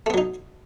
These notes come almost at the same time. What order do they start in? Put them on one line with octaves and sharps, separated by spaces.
A3 B3 F#3 D#4